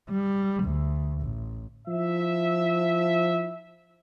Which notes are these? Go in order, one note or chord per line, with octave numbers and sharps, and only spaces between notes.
G3
D2
A1
F3 E4 E5